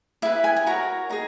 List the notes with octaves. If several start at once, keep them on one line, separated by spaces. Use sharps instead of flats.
E4 G#4 B4 E5
G#5
G#5
F#4 A#4 C#5 A#5
D#4 G#4 A#5